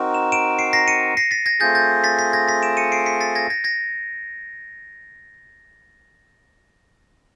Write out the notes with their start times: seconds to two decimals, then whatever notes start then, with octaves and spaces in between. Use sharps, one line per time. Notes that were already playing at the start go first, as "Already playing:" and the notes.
Already playing: C4 D#4 F#4 A#4
0.14 E7
0.32 D7 E7
0.59 C7 D7
0.73 A#6 C7
0.88 C#7 D#7
1.17 A#6 C7
1.31 A6 B6
1.46 G#6 A#6
1.60 A3 C4 F4 G#4 G6 A6
1.75 G6 A6
2.04 A6 B6
2.19 A6 B6
2.33 G#6 A#6
2.48 A6 B6
2.62 D7 E7
2.77 C#7 D#7
2.92 C7 D7
3.06 B6 C#7
3.21 A6 B6
3.35 G#6 A#6
3.50 G#6 A#6
3.64 G#6 A#6